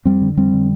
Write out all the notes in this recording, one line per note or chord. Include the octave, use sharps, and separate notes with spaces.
F2 G3 C4
D3
F2 G3 C4
D3